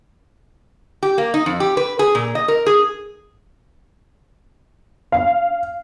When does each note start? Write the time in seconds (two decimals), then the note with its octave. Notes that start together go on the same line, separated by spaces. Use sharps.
1.03 G4
1.18 A#3
1.34 D#4
1.46 F2
1.60 G4
1.77 B4
1.99 G#4
2.15 A#2
2.35 D#5
2.48 A#4
2.66 G#4
5.12 F5